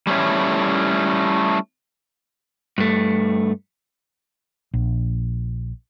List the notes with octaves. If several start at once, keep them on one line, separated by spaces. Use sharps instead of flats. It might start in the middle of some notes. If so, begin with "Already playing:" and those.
G3 A3 A#3 C#4 E4
G2 A3
A#1